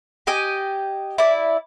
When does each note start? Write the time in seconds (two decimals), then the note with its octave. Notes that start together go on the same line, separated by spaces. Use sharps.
0.27 G4 D#5 G5 G#5
1.18 E4 D5